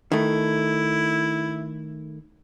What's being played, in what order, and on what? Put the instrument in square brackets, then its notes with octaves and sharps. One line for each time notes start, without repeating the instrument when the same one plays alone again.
[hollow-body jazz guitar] D#3 A3 [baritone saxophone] E4